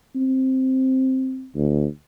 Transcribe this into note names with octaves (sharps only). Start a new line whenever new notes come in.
C4
D2